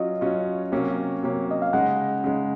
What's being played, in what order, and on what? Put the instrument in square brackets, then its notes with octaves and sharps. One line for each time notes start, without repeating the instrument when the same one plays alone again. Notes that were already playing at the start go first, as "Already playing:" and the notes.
Already playing: [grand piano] F#3 C#4 F4 [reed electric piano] D#5
[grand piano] F#3 C#4 F4
C3 F#3 A#3 C#4
C3 F#3 A#3 C#4
[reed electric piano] D#5
F5
[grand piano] C#3 G#3 D#4 [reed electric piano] F#5
[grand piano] C#3 G#3 D#4